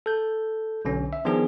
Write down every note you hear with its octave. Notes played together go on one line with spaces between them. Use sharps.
A4 G6
B1 D3 C#4
E5
D#3 F3 B3 D4 G#4